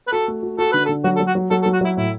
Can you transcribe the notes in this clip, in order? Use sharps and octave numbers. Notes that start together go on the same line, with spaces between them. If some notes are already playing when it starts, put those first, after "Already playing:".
B4
F#4 A4
A3
F#4
F#4 A4
D3 B4
A4
D3
F#3 F#4
A4
F#3
F#4
F#3
F#3 A4
A4
F#3
F#4
F#3 E4
A2 E4